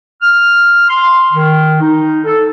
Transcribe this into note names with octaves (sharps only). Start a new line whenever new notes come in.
F6
C6
D#3
D#4
A4